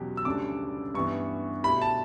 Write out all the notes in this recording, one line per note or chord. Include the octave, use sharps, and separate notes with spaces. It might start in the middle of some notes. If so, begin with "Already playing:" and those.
Already playing: E2 B2 F#3 C#4 G4
E6
D2 C#3 G3 D4 D6
G2 E3 B3 C#6
B2 A3 E4 G4 B5
A5